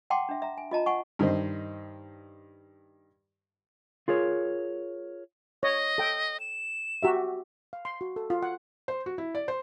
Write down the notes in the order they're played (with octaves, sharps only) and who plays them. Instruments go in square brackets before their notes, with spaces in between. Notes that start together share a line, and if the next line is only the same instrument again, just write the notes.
[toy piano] F#5 G5 A5 C6 D6
D4 E5
E5 A#5
G#5
F4 D#5 A5 A#5
F#5 G#5 C#6
[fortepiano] G2 D#3 C5 D#5
[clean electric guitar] F4 G#4 A#4 C#5
[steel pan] C#5 [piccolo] D#5
[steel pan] A4 G5
[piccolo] E7
[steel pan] F#4 G4 E5
F5
C6
F#4
A4
F4
F#5
[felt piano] C5
F#4
E4
D5
C5